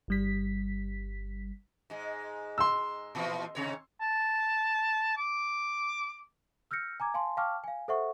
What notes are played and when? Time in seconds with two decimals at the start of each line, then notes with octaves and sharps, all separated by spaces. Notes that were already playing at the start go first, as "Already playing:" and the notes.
0.08 G1 G3 B6
1.90 G#2 G#3
2.58 C6 E6
3.15 A#2 E3 F3
3.55 G#2 C3 C#5
4.01 A5
5.17 D6
6.71 E6 F6 G6 A#6 C#7
7.00 G#5 A#5 D6 G#6
7.14 F5 G#5 A5 C6
7.37 F5 G5 A5 C#6 D6 F6
7.64 F5 G#5
7.88 A4 C5 E5 F#5 C#6